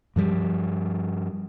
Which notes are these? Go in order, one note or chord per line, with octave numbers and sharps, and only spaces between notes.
G2 F3 G3